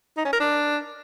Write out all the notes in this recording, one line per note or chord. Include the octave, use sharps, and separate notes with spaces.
D#4
C#4
A#4
D4